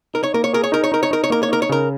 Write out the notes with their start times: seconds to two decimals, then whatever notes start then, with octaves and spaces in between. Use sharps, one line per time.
0.14 D#4 A#4
0.24 C#5
0.34 A#3 A#4
0.44 C#5
0.53 G#4 A#4
0.64 C#5
0.72 D#4 A#4
0.84 C#5
0.92 D#4 A#4
1.03 C#5
1.11 D#4 A#4
1.24 C#5
1.30 A#3 A#4
1.43 C#5
1.49 D#4 A#4
1.62 C#5
1.69 C#3 A#4